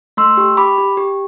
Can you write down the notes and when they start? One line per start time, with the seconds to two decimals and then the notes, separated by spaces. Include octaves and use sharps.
0.17 A3 C6 E6
0.37 G4
0.57 G4 B5 D6
0.78 G4
0.97 G4